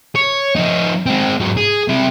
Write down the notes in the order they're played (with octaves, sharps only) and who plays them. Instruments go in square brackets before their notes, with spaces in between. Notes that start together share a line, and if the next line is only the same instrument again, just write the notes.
[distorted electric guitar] C#5
F3 D#4
G#3 C4
G#2 F#3
G#4
C3 E4